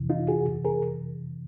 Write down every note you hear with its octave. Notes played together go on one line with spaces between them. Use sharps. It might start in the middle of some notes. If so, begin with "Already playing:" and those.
Already playing: F2 C3 E3
D#4 F4
F#4 G#4
G#4 A#4